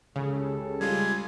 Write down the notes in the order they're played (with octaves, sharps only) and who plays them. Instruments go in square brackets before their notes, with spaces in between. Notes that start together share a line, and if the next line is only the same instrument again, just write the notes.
[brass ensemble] C#2 G4 A4 [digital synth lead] C#3
[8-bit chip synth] G3 G#3 F4 [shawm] G#5